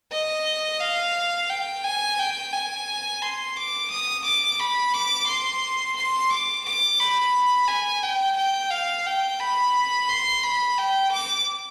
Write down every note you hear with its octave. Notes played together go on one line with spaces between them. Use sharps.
D#5
F5
G5
G#5
G5
G#5
C6
D6
D#6
D6
B5
D6
C6
C6
D6
D6
B5
G#5
G5
G5
F5
G5
B5
C6
B5
G5
D6